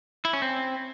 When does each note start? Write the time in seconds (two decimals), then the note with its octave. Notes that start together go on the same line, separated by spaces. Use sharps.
0.25 E4
0.33 C#4
0.42 C4